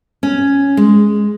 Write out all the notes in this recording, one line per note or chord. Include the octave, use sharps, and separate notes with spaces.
C#4
G#3